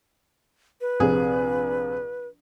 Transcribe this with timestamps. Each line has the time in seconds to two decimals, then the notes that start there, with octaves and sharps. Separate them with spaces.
0.81 B4
1.00 A#1 C3 G#4